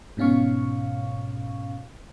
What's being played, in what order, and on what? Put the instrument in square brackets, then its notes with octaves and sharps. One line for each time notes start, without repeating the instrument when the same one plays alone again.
[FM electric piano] G#2 B2 C#4 F5 C#6